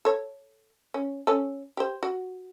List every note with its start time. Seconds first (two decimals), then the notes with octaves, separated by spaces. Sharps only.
0.05 A4 C#5
0.94 C#4
1.27 C#4 A4
1.77 G4 C5
2.03 F#4